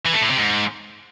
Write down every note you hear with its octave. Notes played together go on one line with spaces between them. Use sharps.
E3
A3
A2
C3
G#2